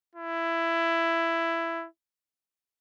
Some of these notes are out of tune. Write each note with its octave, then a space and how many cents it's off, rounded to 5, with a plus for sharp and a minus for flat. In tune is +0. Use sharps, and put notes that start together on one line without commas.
E4 +15